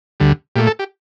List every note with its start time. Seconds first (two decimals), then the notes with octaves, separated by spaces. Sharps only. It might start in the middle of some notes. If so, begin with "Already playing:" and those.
0.20 D2 D3 G3
0.56 A#2 A3 G4
0.67 A4
0.79 G4